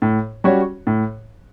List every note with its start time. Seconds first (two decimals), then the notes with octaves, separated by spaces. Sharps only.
0.02 A2
0.44 G3 C#4 F#4 C#5
0.87 A2